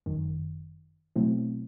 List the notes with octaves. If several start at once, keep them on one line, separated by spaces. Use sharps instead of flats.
G1 F#2 D#3
B2 F#3 A3 C4 E4